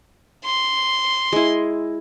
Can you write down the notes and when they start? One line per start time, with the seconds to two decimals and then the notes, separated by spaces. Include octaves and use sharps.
0.45 C6
1.33 G#3 E4